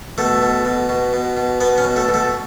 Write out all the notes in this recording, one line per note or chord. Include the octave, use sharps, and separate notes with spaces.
B2 A3
B2
B2
B2
B2
B2
B2 B3
C#4
B2
A3
B2
A3